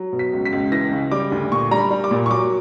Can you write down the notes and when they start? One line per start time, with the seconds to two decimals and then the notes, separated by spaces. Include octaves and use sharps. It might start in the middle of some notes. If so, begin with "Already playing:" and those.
Already playing: F#3
0.13 B2
0.19 B6
0.33 C#2
0.45 B6
0.52 C#2
0.72 E3 A#6
0.92 C#3
1.11 G3 D6
1.32 D2
1.51 A#2 C#6
1.71 G3 A#5
1.78 B5
1.91 G3
2.04 D6
2.11 A#2
2.26 C#6
2.31 F#3 D6